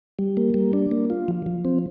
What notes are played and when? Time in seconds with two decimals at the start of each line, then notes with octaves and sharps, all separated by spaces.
0.19 G3
0.37 A#3
0.54 G3
0.73 D4
0.91 A#3
1.10 F4
1.28 F3
1.46 F3
1.65 C4